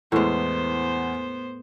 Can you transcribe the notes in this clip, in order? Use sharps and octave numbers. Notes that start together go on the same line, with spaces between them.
E2 A2 G#3 B3 C5